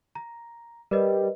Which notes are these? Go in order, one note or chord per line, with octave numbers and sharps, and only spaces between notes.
A#5
G3 A#4 B4 D#5